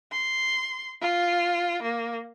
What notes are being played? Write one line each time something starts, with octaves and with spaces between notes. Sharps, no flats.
C6
F4
A#3